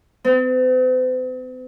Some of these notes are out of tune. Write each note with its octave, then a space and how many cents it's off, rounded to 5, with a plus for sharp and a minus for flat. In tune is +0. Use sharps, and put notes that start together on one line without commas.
C4 -45